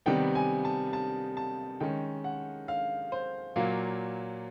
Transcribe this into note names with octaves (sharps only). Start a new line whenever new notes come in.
C3 D#3 G3 B3 G5
G#5
A5
A5
A5
D#3 G#3 C#4 G5
F#5
F5
C5
A#2 F#3 A#3